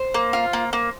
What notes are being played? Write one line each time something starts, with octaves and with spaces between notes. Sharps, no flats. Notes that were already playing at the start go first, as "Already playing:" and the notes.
Already playing: C5
A#3
F4
A#3
A#3